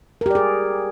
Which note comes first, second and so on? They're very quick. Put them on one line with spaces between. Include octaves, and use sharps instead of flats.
A#4 G4 D5 G#4